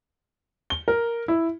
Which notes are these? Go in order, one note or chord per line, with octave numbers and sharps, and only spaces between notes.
G7
A#4
E4